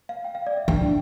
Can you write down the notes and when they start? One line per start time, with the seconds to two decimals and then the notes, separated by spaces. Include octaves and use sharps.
0.09 F5
0.24 G5
0.35 F5
0.47 D5
0.57 E5
0.68 D4 G5